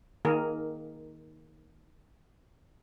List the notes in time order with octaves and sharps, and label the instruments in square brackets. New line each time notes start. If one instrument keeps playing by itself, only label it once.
[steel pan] D#3 A#3 G#4 A#4